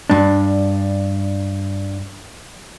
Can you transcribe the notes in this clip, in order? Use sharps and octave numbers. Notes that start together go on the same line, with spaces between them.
G2 D4